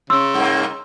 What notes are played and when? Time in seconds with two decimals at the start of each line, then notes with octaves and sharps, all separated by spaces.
0.10 C#3 C6 E6
0.34 G2 A#3